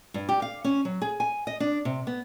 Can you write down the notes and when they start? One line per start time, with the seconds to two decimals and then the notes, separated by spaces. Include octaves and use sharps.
0.14 G2
0.29 G4
0.42 F5
0.64 C#4
0.85 F#3
1.02 G#4
1.20 G#5
1.47 D#5
1.60 D4
1.85 C3
2.07 B3